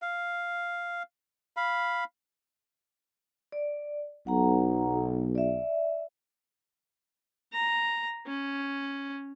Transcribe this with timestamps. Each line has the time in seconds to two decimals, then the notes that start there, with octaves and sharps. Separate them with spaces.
0.02 F5
1.57 F5 B5
3.52 D5
4.27 B1 F#5 A#5
5.35 D5 E5
7.52 A#5
8.26 C#4